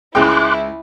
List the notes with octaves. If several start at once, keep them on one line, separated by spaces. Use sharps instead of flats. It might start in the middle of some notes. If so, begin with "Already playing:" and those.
C#2 G#3 E4 G5 C6 D6 F#6